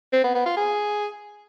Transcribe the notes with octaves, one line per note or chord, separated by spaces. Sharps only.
C4
B3
B3
F4
G#4